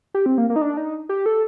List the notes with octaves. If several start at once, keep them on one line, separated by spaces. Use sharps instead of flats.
G4
C4
A#3
A#3
D#4
D4
D#4
G4
A4